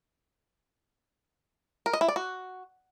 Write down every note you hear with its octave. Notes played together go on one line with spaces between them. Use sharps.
A#4
D#5
E4
D5
F#4